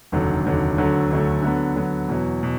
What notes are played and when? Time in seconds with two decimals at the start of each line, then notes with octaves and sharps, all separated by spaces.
0.12 F1 D#2 D3 F#3
0.45 F1 D#2 D3 F#3
0.78 D2 D3 F#3 A3
1.11 D2 D3 F#3 A3
1.42 D3 F#3 B3
1.76 D3 F#3 B3
2.08 E2 B2 F#3
2.43 B2